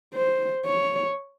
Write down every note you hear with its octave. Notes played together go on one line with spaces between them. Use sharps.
C5
C#5